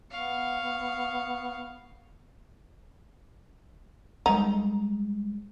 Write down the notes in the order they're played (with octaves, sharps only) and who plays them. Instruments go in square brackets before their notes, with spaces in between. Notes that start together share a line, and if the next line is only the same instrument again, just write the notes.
[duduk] B3 [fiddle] F5 C#6
[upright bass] G3 G#3 [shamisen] D#4